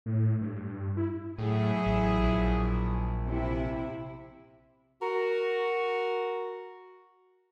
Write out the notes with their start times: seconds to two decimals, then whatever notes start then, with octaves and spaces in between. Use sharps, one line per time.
0.06 A2
0.41 G2
0.97 E4
1.39 A2 F#3 E4 G#4
1.86 A1
2.23 A#1
3.26 C3 E4
5.02 F#4 A#4